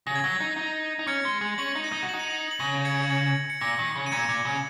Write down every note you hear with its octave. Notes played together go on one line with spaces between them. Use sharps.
C#3 A#6
G#6
F#3 A#6
D#4
D#4
D#4
C#4 G#6 C#7
G#3
G#3
C#4 C#7 F#7
D#4
A#6 D#7
D#4
F#4
D#4 F#7
D#7
C#7 F#7
F#7
C#3 A#6 D#7
G#6 C#7
G#6 C#7
C#7
A#2 A#6
D#3
C#3
D#7
A#2 G#6 C#7
A#2
C#3